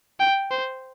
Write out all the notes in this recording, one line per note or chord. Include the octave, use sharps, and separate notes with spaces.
G5
C5